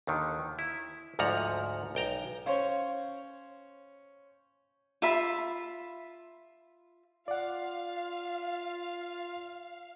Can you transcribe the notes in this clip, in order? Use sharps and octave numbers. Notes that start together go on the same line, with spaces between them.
D#2 D3 D#3
E4
D2 G#2 F3 F#5 A#5
B1 G5 A#5
C#4 C5 C#5 F5
F4 E5 B5
F4 D5 F5 F#5